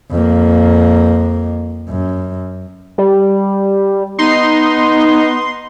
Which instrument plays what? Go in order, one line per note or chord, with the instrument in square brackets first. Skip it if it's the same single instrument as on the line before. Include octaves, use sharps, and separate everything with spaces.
[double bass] F2 A#3
F#2
[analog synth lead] G3
[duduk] B3 [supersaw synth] D#4 [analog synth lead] C6